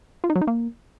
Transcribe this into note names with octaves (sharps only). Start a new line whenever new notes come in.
F4
D#4
F#3
D#4
A#3